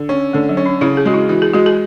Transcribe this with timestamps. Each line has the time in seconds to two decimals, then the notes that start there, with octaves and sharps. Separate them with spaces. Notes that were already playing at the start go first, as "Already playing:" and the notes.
Already playing: D3
0.09 C#4
0.33 D3 A3
0.49 F#3
0.57 C#4
0.66 D4
0.81 C#3 E4
0.97 G#4
1.05 G#3 F#4
1.14 E4
1.29 E3 F#4
1.42 G#4
1.53 G#3 F#4
1.66 G#4